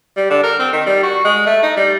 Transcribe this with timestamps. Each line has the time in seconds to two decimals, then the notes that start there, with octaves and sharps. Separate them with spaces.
0.16 G3
0.30 D3
0.43 A#4
0.59 C4
0.73 D#3
0.86 G3
1.03 F#4
1.25 G#3
1.46 A3
1.63 D#4
1.77 G3